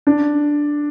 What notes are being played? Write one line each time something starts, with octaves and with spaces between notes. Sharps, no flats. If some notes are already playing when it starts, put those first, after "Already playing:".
D4